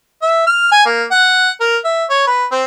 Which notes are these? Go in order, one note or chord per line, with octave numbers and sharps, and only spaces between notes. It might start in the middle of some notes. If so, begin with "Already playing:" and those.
E5
F6
G#5
A#3
F#5
A#4
E5
C#5
B4
C4